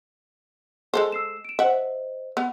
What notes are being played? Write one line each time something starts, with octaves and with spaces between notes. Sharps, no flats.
G#3 A4 C5
E6 C7 E7
D7 E7
C5 D#5 E5 F#5
B3